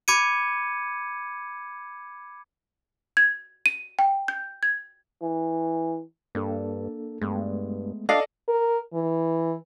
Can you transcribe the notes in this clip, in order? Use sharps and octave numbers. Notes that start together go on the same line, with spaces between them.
B5 D6 G#6 C#7 D#7
G#6
D#7
G5
G6
G#6
E3
G2 A#3 D4 A4
G2 G#3 A3 B3
D4 A4 D5 D#5 F5
A#4
E3